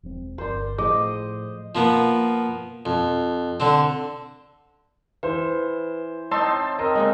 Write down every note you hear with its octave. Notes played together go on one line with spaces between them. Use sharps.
E1 F3 C4
G1 A#4 C5 D5
A2 F3 A3 G#4 C5 D#5
F3 A#3 B3
F2
D3 C4
E3 B4 C5
C4 D#4 C#5 A5 C6 E6
C4 A#4 D#5
G#3 A#3 D#4